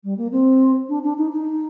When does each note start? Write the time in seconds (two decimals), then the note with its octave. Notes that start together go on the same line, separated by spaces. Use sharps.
0.04 G3
0.18 A#3
0.32 C4
0.89 D4
1.03 D4
1.18 D#4
1.32 D#4